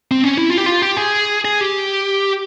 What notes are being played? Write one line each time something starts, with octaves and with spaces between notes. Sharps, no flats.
C4
C#4
E4
F4
G4
F4
G4
G#4
G#4
G4